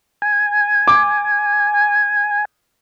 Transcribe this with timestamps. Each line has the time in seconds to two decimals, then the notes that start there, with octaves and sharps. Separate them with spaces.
0.22 G#5
0.88 D6